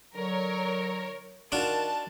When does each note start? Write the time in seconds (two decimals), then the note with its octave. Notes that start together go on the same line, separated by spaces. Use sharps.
0.15 D3 F#3 A#4 C#5
1.52 D#3 D4 F4 F#4 A#4 A5